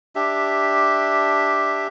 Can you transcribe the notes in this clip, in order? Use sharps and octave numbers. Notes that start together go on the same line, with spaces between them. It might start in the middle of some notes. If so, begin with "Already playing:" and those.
D4 G4 E5